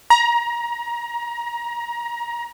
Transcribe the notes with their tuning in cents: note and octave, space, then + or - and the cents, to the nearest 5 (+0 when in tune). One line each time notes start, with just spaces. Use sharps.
A#5 +25